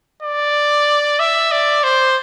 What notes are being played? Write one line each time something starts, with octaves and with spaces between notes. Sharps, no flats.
D5
E5
D5
C5